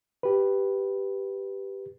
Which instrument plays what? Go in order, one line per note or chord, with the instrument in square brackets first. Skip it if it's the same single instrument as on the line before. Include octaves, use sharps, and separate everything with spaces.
[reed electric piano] G4 B4